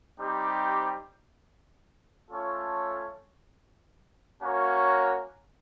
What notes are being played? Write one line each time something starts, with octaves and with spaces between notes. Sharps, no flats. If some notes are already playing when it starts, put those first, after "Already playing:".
G3 C4 D#4 G4
A3 C#4 F4 A4 C#5
A#3 C#4 F#4 A#4 C#5